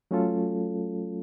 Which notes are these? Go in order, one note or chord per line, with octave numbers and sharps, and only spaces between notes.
F#3 A3 C#4 F4 A4